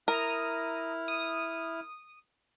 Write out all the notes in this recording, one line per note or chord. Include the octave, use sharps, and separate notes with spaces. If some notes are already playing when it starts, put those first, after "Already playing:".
E4 A#4 A#5 D#6 F6
D#6